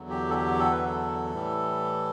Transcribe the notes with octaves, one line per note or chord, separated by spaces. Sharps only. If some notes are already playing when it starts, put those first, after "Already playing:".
Already playing: E2 D3 F#3
G4
A4
G4
A4
B4
A4
A2 E3 G3